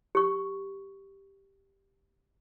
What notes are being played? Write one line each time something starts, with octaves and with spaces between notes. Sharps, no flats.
G4 C#6